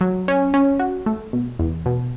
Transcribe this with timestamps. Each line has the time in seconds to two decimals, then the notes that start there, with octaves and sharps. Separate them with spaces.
0.01 F#3
0.28 C#4
0.54 C#4
0.79 F#4
1.06 A3
1.33 B2
1.59 E2
1.86 B2